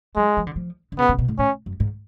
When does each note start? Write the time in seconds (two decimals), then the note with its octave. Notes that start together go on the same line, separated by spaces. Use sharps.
0.16 F#3 G#3
0.37 F3
0.47 D3
0.56 F3
0.92 D3
0.99 C#3 B3
1.09 C#3
1.19 B2
1.28 A2
1.39 A2 C#4
1.66 F#2
1.80 G#2